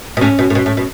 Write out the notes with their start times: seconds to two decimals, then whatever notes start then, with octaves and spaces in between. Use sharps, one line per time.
0.17 B2
0.21 A2 C#4
0.39 B2
0.50 A2
0.55 B2
0.66 A2
0.77 B2